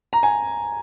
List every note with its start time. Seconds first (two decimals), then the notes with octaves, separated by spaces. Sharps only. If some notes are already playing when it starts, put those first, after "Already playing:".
0.13 A#5
0.23 G#5